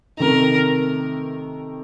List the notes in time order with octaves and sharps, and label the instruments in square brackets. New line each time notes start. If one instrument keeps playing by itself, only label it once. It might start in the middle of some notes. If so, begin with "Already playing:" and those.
[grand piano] C3 D#3 A3 D#4 [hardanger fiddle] A#4